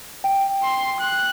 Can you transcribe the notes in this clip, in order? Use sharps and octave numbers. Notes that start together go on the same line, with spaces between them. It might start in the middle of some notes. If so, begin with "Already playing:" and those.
G5
C6
F#6